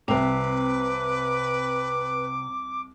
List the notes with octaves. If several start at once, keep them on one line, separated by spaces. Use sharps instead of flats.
C2 C3 C4 B4 D6 F7